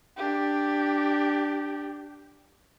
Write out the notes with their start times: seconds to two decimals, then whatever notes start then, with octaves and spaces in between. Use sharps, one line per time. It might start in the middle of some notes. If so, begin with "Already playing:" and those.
0.17 D4 G4